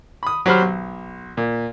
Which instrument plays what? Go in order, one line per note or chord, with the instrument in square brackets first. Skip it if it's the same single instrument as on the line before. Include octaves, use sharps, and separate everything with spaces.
[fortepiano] B5 D#6
F#3 G4 C5 B5 F6
B1
A#2